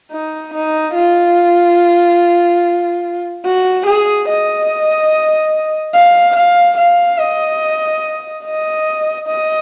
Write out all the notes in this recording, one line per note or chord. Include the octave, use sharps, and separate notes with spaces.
D#4
D#4
F4
F#4
G#4
D#5
F5
F5
F5
D#5
D#5
D#5